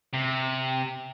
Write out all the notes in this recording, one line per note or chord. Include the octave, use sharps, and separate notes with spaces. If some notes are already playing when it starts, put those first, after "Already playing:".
C3